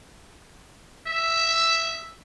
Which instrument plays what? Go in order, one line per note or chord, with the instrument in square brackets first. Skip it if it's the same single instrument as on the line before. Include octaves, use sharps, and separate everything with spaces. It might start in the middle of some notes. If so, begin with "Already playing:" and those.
[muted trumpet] E5